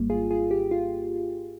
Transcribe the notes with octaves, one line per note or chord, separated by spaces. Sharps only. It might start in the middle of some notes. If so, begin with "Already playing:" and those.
Already playing: G#1 G#2 G3 A#3
F4 G#4
F4 G#4
G4
F4